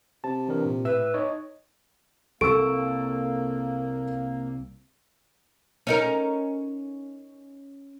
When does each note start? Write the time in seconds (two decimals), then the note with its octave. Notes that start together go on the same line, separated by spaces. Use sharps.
0.24 C3 A5
0.48 E3 D4 A#4
0.65 A#2
0.85 A2 B4 E5 E6
1.14 D#4 C#5 D#5
2.41 C2 A#3 A4 C#6 E6 D7
5.87 C#4 D#4 A#4